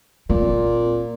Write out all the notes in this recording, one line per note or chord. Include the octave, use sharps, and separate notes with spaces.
A#2 C4